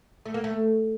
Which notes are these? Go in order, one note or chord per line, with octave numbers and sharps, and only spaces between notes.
A3
A#3
A3